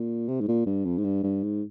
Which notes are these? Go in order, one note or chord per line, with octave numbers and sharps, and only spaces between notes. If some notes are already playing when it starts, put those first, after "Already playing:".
Already playing: A#2
C3
G#2
A#2
G2
F2
G#2
G2
G2
G#2